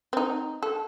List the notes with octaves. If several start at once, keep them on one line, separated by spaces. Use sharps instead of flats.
C4 D#4
A4